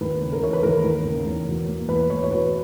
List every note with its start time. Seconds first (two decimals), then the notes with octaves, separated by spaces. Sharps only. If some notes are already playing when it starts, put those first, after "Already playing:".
0.01 D#2 B4
0.21 C#3
0.32 A#4
0.43 E3 C#5
0.53 B4
0.63 D#2 A#4
0.84 D#2
1.05 C#3
1.26 E2
1.47 B2
1.68 A#3
1.88 E2 B4
2.10 E2 C#5
2.24 C#5
2.31 B2 B4